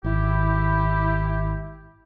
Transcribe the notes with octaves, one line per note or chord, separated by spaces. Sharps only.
G#1 E4 G4